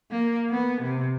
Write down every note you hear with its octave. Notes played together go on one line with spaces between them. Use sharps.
A#3
B3
C3